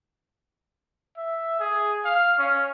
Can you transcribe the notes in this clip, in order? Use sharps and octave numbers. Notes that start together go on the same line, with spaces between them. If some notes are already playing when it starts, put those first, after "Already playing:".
E5
G#4
F5
C#4